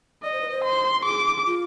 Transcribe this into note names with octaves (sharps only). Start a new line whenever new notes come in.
D5 D#5
C5
B4
C5
C6
G#4 D6
F4